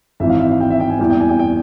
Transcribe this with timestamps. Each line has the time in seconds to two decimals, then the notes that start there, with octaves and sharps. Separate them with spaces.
0.20 G#1 G#2 E3 E5
0.30 F5
0.40 E5
0.49 F5
0.60 G5
0.70 E5
0.80 G5
0.90 G#5
0.99 E2 E3 G3 G5
1.10 G5
1.20 G#5
1.29 G5
1.39 G5